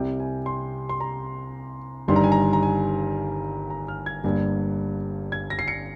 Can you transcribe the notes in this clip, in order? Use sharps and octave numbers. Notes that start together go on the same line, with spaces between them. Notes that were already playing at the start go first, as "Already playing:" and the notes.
Already playing: C2 C3 G3 G5
G#5
C6
C6
A#5
G1 G2 D#3 G3 C6
A#5
G#5
A#5
A#5
G#5
A#5
F6
G#6
G1 G2 G3 A#3
G#6
A#6
C7
C#7